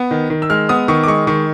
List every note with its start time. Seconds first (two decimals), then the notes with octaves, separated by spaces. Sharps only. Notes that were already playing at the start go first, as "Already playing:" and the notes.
Already playing: B3
0.11 D#3
0.30 D#3
0.42 E6
0.50 G#3 F6
0.69 B3 D#6
0.88 D#3 C#6
1.03 D6
1.07 G#3 C#6
1.27 D#3 C#6